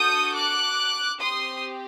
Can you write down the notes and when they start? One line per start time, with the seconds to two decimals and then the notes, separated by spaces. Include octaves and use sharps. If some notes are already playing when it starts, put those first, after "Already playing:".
Already playing: D4 F#4 A4 D#6 G6
0.35 D6 F#6
1.21 C4 G4 C6 D#6